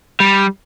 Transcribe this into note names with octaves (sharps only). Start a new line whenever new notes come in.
G3